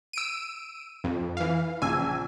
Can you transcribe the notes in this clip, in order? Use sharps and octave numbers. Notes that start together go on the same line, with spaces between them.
E6 D7 D#7
F2
E3 F5
A#1 C#3 G#5 E6